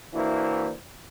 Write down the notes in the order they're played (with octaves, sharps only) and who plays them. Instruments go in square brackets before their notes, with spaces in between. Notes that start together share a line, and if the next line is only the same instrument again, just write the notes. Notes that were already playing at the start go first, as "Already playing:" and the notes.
[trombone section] E3 A#3 D4 E4 F#4 C5